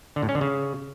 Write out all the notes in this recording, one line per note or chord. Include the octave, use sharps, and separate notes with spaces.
D3
A2
C#4
D3
C#3